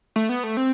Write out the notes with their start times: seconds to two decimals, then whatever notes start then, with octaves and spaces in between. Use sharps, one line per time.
0.16 A3
0.29 B3
0.44 A3
0.57 C4